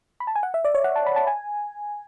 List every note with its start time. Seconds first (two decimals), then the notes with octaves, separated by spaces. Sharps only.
0.20 B5
0.27 A5
0.35 G#5
0.43 F#5
0.54 E5
0.65 D5
0.75 C#5
0.84 F#5
0.96 A5
1.06 B5
1.16 A5
1.27 G#5